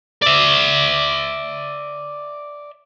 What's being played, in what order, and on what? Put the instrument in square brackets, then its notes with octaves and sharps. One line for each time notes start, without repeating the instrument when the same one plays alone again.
[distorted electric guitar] D5 E5